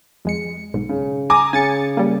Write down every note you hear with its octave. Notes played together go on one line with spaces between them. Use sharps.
F2 G#3 C#7
B1 G#2
C#3
G#5 A#5 D6 D#6
C#3 G#5 A6 C#7
G3 A#3